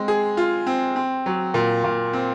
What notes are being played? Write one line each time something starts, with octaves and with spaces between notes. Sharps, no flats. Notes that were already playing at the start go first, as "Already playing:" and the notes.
Already playing: G#3 C4
G#4
F4
C4
C4
F#3
A#2
A#2
C4